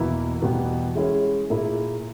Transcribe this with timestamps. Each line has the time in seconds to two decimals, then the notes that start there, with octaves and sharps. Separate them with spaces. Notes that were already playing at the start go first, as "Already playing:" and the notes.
Already playing: E2 B2 A#3 E4
0.41 E2 B2 G3 B3
0.95 G#3 C#4 E4 G#4
1.50 A#2 A#3 E4 G#4